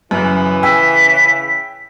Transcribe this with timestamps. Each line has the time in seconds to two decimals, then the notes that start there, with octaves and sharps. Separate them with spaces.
0.11 F#2 C#3 E3
0.63 G5 G#5 E6 B6